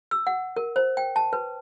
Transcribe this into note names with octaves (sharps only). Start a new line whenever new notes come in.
E6
F#5
A#4
C5
G5
A5
B4